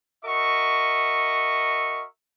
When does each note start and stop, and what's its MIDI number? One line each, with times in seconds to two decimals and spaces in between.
0.25 2.05 66
0.25 2.05 70
0.25 2.05 75
0.25 2.05 76
0.25 2.05 85